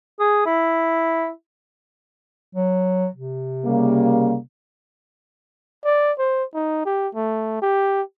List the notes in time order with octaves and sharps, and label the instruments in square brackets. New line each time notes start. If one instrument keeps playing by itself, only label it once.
[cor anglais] G#4
E4
[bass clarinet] F#3
C3
[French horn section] C#3 G3 A#3
[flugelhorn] D5
C5
D#4
G4
A3
G4